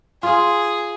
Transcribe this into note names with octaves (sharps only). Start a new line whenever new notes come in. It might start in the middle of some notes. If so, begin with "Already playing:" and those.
F4 G#4